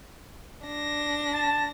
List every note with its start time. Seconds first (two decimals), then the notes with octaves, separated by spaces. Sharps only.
0.66 D4 A#6
1.33 A5